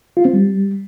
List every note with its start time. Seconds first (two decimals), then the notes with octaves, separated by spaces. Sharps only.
0.17 F4
0.25 C4
0.33 G3